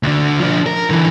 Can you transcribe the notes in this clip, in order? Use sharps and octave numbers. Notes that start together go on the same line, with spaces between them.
D2 D3
F3 D4
A#4
D3 E3